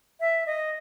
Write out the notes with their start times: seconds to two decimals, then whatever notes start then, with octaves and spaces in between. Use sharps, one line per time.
0.20 E5
0.46 D#5